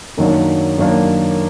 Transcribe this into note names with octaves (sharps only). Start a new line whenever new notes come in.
F#2 D#3 F#3 A#3 D4
F#2 D#3 F#3 A#3 D4